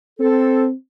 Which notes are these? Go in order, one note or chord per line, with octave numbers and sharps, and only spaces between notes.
C4 A4